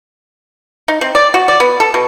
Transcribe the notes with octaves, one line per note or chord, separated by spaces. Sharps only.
D#4
C4
D5
F#4
D5
B3
A4
B2